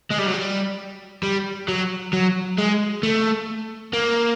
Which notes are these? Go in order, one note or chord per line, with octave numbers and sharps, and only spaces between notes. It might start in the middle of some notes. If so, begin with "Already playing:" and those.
G#3
G3
F#3
G3
G3
F#3
F#3
G#3
A3
A#3